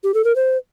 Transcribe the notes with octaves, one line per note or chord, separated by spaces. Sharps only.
G4
A4
A#4
C5